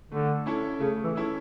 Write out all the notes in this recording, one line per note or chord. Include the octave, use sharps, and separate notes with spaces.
D3 A3
C#4 E4 A4
C#3 A3
E3
C#4 E4 A4